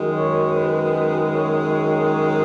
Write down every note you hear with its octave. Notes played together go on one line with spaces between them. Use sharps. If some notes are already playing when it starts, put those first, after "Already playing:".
Already playing: F#2 D#3 G#3
C#5
B4
C#5